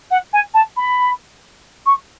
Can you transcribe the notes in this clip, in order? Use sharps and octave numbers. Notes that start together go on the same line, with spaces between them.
F#5
G#5
A5
B5
C#6